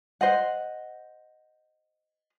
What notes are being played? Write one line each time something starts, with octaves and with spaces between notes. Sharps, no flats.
C5 D#5 F#5